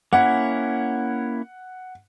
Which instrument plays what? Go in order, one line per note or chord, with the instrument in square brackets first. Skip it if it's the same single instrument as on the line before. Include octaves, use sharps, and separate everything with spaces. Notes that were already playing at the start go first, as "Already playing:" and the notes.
[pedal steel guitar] A#3 C#4 E4 [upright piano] F#5